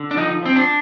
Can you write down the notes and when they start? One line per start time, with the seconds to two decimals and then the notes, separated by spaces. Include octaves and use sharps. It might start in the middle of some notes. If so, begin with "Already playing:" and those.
Already playing: D3
0.11 D4
0.17 F3 D#4
0.43 F3 C4
0.56 D4